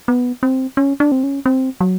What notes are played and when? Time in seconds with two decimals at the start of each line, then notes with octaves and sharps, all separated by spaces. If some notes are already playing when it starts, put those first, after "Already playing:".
0.08 B3
0.43 C4
0.77 C#4
1.00 D4
1.12 C4
1.24 C#4
1.46 C4
1.81 F#3